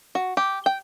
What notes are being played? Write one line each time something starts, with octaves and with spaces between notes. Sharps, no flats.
F#4
G4
G5